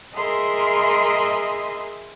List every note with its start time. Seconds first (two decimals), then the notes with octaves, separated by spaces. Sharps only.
0.16 G#4 A#4 D#5 E5 B5 C6